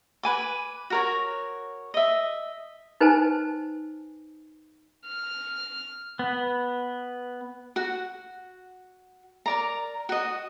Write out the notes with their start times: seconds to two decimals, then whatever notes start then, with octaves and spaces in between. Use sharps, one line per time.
0.23 B4 G#5 D6
0.90 F#4 A#4 C#5
1.94 D#5 E5
3.01 D#4 B4 C5 G#5 A5
5.08 F6
6.19 B3
7.76 F#4 F#5
9.46 A#4 D5 A#5
10.09 F#4 D#5